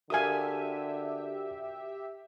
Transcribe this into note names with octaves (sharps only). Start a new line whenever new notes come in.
D3 F#4 G4 A#4 E5 F5 G#5 D#6